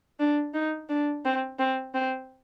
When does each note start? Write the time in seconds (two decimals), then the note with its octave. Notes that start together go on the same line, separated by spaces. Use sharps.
0.20 D4
0.54 D#4
0.89 D4
1.25 C4
1.59 C4
1.94 C4